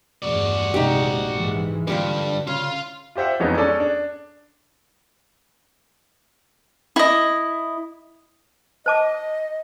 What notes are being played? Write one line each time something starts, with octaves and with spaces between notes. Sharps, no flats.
E2 G2 F#4 D5
A#1 C3 G#3 D#4 G4
G#2 E3 G#3
G2 D3 F4 G4 D5
C#3 F4 F5
F4 G4 C5 E5 F#5
F2 E3 G#3 B3 C#4 D#4
C#4 G#4 A4 C#5 D5
D4
E4 D#5
C5 D#5 A5 D6